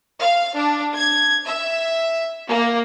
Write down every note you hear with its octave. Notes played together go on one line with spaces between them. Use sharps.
F5
D4
G#6
E5
A#3